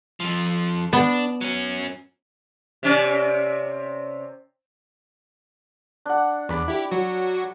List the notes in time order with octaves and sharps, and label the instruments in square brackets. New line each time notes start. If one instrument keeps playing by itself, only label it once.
[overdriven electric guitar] F2 F3
[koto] B3 [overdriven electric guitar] D4
[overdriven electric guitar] F#3 C#4
[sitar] C3 C#4 D5
[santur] D4 F#5
[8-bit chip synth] E2 [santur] D5 B5
[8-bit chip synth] E4 G4
F#3 F#4